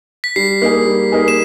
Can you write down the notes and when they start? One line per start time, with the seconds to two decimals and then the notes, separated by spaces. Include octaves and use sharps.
0.24 B6
0.36 G3 C7
0.62 A#3 D#4 G#4
0.86 G3
1.12 A#3 D#4 G#4
1.28 E7